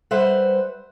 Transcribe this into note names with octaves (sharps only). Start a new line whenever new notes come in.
G3 B4 C5 E5 F#5